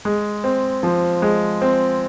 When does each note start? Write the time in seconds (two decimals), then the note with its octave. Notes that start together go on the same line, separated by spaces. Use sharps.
0.05 G#3
0.44 C4
0.83 F3
1.22 G#3
1.62 C4